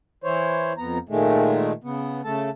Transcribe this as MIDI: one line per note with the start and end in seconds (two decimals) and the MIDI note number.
0.24 0.73 52
0.24 0.73 64
0.24 0.73 72
0.24 0.73 73
0.78 0.98 41
0.78 0.98 59
0.78 0.98 82
1.09 1.72 46
1.09 1.72 51
1.09 1.72 56
1.09 1.72 57
1.84 2.21 49
1.84 2.21 59
2.24 2.50 49
2.24 2.50 57
2.24 2.50 69
2.24 2.50 81